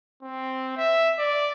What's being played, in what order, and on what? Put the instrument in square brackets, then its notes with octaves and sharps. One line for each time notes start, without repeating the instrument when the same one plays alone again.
[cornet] C4
E5
D5